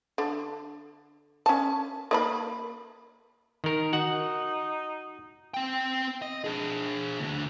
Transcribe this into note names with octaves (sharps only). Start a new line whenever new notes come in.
D3
C#4 A5
A#3 D#5 B5
D#3 A#4
D#4 F#4 F#5
C4 G5
D#5
D4 G#4
D2 D4